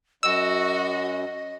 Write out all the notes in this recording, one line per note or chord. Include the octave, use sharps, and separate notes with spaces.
F#2 F#4 D#5 E6